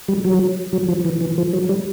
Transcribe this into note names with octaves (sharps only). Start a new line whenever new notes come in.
G3
F#3
F#3
F3
E3
E3
F3
F#3
G3